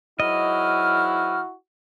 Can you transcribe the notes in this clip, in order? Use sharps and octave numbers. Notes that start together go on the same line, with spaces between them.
G#2 F#3 E4 F#4 D#5 F6